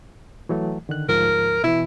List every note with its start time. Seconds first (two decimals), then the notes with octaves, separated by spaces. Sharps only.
0.49 E3 F#3 A3
0.89 D3 D#3 F#6
1.09 D2 G#2 F3 A#4
1.64 B2 E3 E4